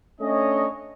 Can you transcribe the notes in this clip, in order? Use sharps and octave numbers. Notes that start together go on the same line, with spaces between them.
A3 C#4 D4 C#5 D#5